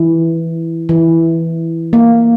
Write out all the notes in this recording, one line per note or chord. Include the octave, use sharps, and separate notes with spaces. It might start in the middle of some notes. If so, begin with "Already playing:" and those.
Already playing: E3
E3
A#3